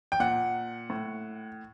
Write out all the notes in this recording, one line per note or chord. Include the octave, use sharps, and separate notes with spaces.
G5
A#2 F#5
A2